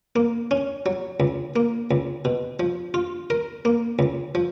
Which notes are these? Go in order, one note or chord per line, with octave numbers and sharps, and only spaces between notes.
A#3
C#4
F#3
C#2
A#3
C#2
B2
F3
F4
A#4
A#3
C#2
F3